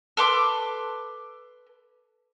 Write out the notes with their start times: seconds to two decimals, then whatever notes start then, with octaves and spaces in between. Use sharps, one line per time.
0.17 A4 B4 C6 D6